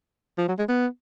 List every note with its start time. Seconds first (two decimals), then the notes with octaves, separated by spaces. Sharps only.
0.38 F3
0.48 F#3
0.58 G#3
0.68 B3